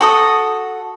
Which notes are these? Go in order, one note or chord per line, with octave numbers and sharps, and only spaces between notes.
F#4 A4 D#6